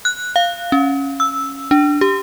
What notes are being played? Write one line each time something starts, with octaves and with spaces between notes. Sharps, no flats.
F#6
F5
C#4
E6
D4
G4